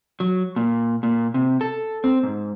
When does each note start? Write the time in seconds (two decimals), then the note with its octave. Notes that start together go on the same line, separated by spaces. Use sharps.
0.20 F#3
0.56 A#2
1.03 A#2
1.34 C3
1.61 A4
2.04 C4
2.23 G#2